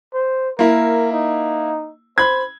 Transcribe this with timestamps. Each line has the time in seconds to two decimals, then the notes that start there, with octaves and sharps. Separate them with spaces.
0.14 C5
0.59 A#3 E4 A#4
1.13 D#4
2.18 C5 B5 G#6